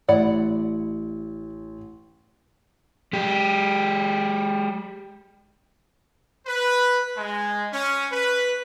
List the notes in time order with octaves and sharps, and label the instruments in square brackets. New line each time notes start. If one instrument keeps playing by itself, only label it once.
[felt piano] A1 [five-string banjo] E4 D5 F#5
[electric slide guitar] G#3 G4
[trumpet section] B4
G#3
C#4
B4